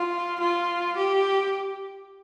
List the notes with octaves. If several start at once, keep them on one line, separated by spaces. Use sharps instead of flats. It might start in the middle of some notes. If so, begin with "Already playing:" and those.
Already playing: F4
F4
G4